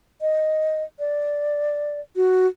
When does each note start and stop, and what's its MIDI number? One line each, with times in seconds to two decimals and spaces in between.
0.21 0.83 75
0.99 2.00 74
2.16 2.47 66